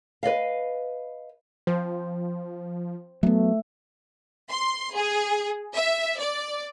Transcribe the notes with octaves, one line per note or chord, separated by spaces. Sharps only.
B4 D5 D#5 F5
F3 C5
F#3 A3 B3
C6
G#4
E5
D5